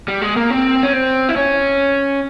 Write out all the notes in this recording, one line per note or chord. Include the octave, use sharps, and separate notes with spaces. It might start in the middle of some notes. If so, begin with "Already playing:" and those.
G3
G#3
A#3
C4
C#4
C4
E4
C#4